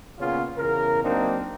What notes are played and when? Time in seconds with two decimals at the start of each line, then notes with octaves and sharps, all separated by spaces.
0.19 A#2 C#3 B3 C#4 F4
0.57 E2 C#3 A#4
1.03 F#3 A#3 C4 D4 D#4